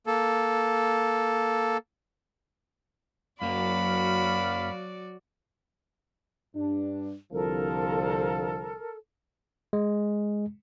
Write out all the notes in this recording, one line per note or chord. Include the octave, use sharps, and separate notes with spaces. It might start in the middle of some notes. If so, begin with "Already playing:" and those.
A#3 A4
F#2 F#3 A#3 F#4 D5 F5 B5
G2 D4
C2 D3 F3 A4 A#4
G#3